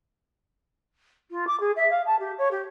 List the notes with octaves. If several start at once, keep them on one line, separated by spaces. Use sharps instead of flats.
F4
D6
G#4
E5
F5
A5
G4
C#5
G4